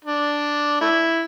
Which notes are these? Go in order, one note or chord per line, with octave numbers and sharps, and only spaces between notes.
D4
A3 E4